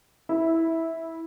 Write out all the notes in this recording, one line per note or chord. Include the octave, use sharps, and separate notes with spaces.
E4